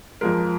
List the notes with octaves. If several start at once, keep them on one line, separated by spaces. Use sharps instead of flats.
F2 F3 G#3 A#4